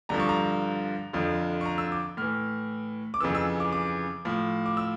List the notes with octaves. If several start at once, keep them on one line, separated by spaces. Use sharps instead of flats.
G2 D3 F3 A#5
C#6
A#5
F2 D3 F3
C#6
A#5
E6
D6
A2 E3 F6
D6
F2 C#3 E3 E6
E6
D6
D6
A2 F3
D6
E6